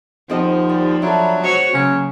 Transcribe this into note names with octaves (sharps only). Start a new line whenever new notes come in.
D#2 F3 C4 A4 C5 D#5 F#5
G3
F#3 D4 A4 E5 A#5 B5
G#3 F#4 C5 C#5
C#3 F#3 A#3 C#4